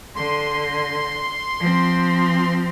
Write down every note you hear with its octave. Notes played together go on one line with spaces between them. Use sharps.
D3 C6
F3 C4